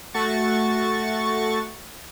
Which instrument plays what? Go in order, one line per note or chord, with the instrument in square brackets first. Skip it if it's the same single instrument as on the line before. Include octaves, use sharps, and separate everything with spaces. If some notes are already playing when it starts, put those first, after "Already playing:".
[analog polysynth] A3 F#4 C#6 A6